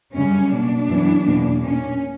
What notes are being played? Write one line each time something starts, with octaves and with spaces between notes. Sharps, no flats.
F#2 C#3 G3 C#4
B2 A#3 D4
F#2 E3 B3
E2 B2 A#3
A#2 A#3 C#4